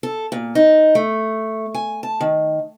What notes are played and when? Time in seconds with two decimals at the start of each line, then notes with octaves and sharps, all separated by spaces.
0.03 A4
0.32 A#2
0.55 D#4
0.95 A3
1.74 G#5
2.03 A5
2.21 D#3